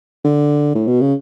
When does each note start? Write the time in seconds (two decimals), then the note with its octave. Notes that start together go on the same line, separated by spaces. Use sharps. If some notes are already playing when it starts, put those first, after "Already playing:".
0.25 D3
0.75 A2
0.87 B2
1.01 C#3